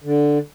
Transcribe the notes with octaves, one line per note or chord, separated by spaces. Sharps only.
D3